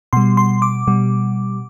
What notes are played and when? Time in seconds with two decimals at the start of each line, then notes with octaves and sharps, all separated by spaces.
0.13 B2 G3 C6
0.37 C6
0.62 D6
0.87 B2 G3